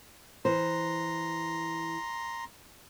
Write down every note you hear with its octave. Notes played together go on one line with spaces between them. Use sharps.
E3 C5 A#5 C6